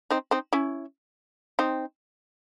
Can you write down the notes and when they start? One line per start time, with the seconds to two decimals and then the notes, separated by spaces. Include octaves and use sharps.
0.10 C4 D#4
0.31 C4 D#4
0.53 C#4 E4
1.59 C4 D#4